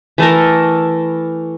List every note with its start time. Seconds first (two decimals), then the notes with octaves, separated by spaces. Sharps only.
0.18 E3 A3 A4 A#4